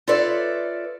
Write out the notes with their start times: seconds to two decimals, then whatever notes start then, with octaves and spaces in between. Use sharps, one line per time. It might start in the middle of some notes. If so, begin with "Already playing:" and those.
0.08 F4 A4 B4 C#5 D5 E5